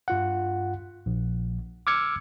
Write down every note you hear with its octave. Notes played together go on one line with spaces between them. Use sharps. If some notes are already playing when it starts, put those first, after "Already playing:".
G2 F4 F#5
A#1
D6 E6 F6 G#6 C#7